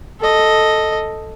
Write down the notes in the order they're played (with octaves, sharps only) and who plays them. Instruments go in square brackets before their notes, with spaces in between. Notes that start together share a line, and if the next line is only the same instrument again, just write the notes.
[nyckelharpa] A4 D#5